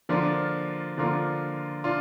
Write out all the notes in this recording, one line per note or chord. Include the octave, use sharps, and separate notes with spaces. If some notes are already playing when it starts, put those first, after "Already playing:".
D3 F3 A#3 D4 F4
D3 F3 A#3 D4 F4
D4 F4